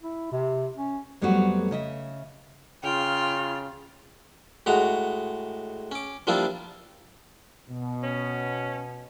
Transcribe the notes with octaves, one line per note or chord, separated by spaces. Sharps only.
E4
C3
C#4
F2 F#3 G3 A3 B3 F#4
C#3 D#5 E5
C#3 F4 G5 F6
A2 G#3 F#4 A#5
C#4 D6
F3 G3 A#3 D4 E4 F4
B2
C#4